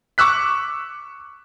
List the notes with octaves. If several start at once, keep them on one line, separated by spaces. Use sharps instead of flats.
C#6 D6 E6 F#6 B6